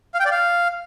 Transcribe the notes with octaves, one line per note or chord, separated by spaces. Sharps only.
F5
G5
D5
F5